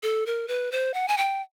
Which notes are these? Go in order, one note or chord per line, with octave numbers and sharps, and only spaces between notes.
A4
A#4
B4
C5
F#5
G#5
G5